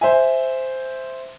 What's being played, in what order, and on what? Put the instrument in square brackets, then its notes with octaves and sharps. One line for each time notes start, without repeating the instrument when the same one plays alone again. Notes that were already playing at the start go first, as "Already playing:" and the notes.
[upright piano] C5 E5 G#5